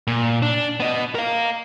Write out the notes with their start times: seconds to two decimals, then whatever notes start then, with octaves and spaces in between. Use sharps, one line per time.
0.07 A#2
0.42 D4
0.80 B3 D#5
1.15 A#4 F5